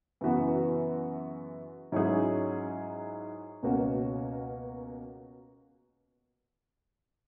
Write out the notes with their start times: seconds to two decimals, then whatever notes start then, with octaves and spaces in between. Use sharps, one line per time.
0.21 F#2 C#3 E3 B3 F#4
1.92 G#2 F#3 C#4 E4 G#4
3.63 C#2 B2 A#3 C#4 F#4